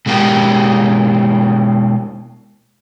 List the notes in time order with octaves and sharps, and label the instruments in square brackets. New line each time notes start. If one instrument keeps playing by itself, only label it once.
[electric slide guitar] B2 G#3 A#3 E4 G4